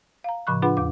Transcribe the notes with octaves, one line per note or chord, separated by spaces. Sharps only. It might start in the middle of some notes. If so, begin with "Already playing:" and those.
F5 A#5
A2 C#3 F3 B5 C#6 F#6
D4 F4 G#4 B4 F#5 B5
E2 D6